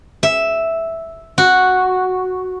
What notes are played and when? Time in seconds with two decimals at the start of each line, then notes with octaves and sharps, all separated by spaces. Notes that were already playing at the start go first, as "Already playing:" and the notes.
0.23 E5
1.38 F#4